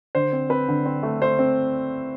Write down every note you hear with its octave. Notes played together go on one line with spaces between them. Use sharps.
D3 C5
C4
C4 B4
D3
C4
A3
A3 C5
C4